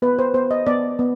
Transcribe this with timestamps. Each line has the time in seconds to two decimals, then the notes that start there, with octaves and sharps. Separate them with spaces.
0.02 B3 B4
0.19 C5
0.34 B3 C5
0.51 D#5
0.67 B3 D5
0.99 B3